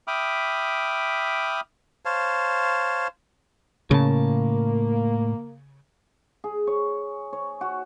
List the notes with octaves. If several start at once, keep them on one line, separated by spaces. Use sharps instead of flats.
E5 G5 B5 D6 D#6 F6
C5 C#5 F5 A5
A2 C#3 A#3 A5
G#4
C#5
C#5
F#4